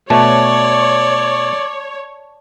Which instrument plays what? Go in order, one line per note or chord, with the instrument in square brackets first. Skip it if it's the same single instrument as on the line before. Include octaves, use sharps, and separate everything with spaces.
[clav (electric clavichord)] B2 A3 [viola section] C#5 [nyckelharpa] D5 [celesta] A5